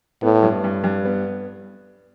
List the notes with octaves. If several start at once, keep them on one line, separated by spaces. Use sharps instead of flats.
A2 B3
G2
G2
G2
B3